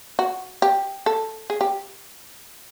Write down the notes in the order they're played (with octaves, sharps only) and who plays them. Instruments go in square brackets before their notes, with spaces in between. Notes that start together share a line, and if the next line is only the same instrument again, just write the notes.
[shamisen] F#4
G4
A4
G#4
G4